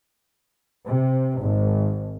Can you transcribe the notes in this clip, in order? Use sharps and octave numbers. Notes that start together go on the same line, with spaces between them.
C3
G#1